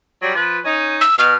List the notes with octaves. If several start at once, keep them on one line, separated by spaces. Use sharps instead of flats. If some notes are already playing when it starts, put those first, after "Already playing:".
F#3 G3
F3 B4
C#4 D#4
E6
B2 F6